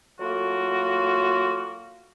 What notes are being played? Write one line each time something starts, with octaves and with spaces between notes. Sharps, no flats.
F#3 A3 A#3 F4 F#4 A#4